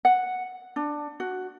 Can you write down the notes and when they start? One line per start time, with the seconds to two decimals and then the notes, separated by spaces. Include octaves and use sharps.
0.05 F#5
0.76 D4
1.20 F#4